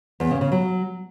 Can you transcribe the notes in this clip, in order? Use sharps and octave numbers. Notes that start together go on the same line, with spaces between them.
E2
C#3
C#3
F#3